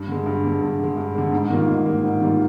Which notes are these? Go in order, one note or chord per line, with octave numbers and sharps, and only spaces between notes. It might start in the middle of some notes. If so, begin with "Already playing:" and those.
Already playing: G2
D3 G#3
G2
D3 G#3
G2
D3 G#3
G2
D3 G#3
G#2
D#3 G3 A#3 F4
G#2
D#3 G3 A#3 F4
G#2
D#3 G3 A#3 F4